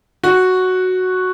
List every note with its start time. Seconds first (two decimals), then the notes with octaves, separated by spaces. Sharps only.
0.24 F#4